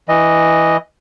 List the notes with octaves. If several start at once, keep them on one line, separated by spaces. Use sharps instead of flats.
E3 D#5